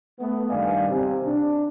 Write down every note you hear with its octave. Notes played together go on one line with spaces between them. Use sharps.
A3 B3
G2 D#3 D5 F5 G#5
C3
D4